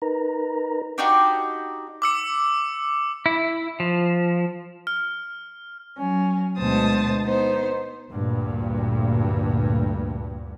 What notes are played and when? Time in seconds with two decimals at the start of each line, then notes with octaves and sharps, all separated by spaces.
0.02 D#4 A#4 B4 A#5
0.98 D4 D#4 F#4 G4
2.02 D6 E6 C#7
3.26 E4
3.80 F3
4.87 F6
5.98 F#3 C#4
6.57 D2 B2 G#3 C5 A5 D#6
7.24 B3 D#4 C5
8.13 D2 G2 A#2